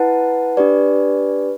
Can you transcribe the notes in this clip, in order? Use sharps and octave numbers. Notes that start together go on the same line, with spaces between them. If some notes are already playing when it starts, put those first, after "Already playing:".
Already playing: E4 B4 F#5 A5
D4 G4 B4 D5